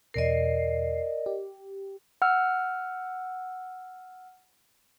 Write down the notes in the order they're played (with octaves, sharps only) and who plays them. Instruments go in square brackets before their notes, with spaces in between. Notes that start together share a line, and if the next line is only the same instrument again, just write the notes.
[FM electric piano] E2 B2 C7 [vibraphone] A#4 D5 D#5
[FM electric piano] G4
[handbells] F#5 E6 F6